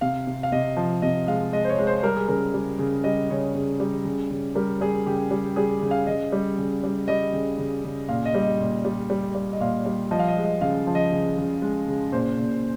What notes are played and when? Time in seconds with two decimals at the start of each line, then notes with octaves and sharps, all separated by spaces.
0.01 C3 F5
0.27 C3
0.43 F5
0.52 C3 D#5
0.77 F3
1.02 C3 D#5
1.27 G#3 F5
1.53 G#3 D#5
1.65 C5
1.69 C#5
1.79 G#3
1.87 C5
2.03 G3 A#4
2.16 G#4
2.28 C#3 A#4
2.54 G3
2.79 C#3
3.04 G3 D#5
3.30 C#3 C#5
3.55 C#3
3.80 G3
4.05 C#3
4.31 C#3
4.55 G3 A#4
4.81 G3 G#4
5.06 C#3 G4
5.31 G3
5.56 G3 G#4
5.82 C#3
5.91 F5
6.07 C#3 D#5
6.32 G3
6.58 C#3
6.84 G3
7.08 G3 D#5
7.33 C#3
7.58 C#3
7.84 C#3
8.09 A#2 F5
8.25 D#5
8.34 G3
8.42 D#5
8.60 A#2
8.85 G3
9.10 G3
9.35 G3
9.53 D#5
9.60 A#2 F5
9.85 G3
10.11 F3 D#5
10.19 F5
10.28 D#5
10.37 G#3
10.45 D#5
10.61 C#3 F5
10.87 F3
10.95 D#5
11.12 C#3
11.38 C#3
11.62 G#3
11.88 C#3
12.12 A#2 C5
12.39 A#2